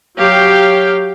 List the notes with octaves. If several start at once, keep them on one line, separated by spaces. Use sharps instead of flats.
F#3 G4 F5 G5